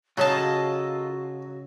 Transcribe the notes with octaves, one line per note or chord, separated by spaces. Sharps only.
C#3 F#3 F4 F#4 A4 D#5 A5